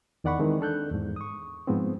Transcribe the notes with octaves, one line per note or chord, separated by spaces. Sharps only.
E2 D#3 D5 F#5 B5 C#6
D#3 E3 G#3 C4
D4 A4 F#6 G6
E2 G#2
C#6 D#6
G#2 F3 G#3 B3 C4